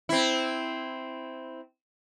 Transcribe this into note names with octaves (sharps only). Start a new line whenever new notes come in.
C4 E4